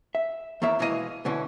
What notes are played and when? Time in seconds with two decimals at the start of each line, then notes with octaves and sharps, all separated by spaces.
0.15 E5
0.62 E2 D#3 A#3 C#5 E5
0.79 B2 E3 G#3 B3 D#5 F5
1.25 D2 B2 D3 E3 C#4